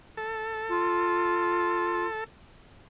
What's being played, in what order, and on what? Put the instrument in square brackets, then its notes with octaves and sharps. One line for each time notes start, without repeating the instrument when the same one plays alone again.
[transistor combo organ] A4
[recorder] F4